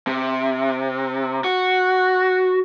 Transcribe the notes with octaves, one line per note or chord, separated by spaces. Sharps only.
C3
F#4